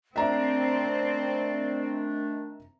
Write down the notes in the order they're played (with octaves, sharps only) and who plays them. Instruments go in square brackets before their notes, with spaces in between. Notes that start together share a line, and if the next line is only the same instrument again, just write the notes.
[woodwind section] D#3 A3 D4 [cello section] C4 [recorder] D5 [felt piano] E5 A#5